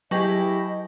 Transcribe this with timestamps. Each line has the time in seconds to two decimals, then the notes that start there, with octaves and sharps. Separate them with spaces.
0.11 F#3 E4 G4 G#4 D#5 C#6 A#6